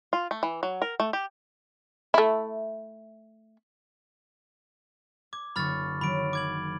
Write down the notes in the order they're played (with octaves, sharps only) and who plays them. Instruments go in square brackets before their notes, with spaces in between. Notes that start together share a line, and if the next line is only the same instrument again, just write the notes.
[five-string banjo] F4
A3
E3
F#3
A#4
A3
G4
[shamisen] A3 E4
[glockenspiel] D6 [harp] G#6
[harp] F#1 D3 C#6 [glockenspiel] B5 F6 A6
[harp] D#3 F#3 C#4 [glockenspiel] B5 D7
[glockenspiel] D6 G#6 F#7